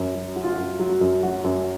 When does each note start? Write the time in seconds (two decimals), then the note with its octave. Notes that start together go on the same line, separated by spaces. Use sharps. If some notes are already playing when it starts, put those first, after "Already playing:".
Already playing: F#2
0.15 F#3
0.36 F#3 F#4
0.44 F4
0.52 F#4
0.58 F#2
0.79 F#3 F4
1.01 F#2
1.23 F#3 F#4
1.44 F#2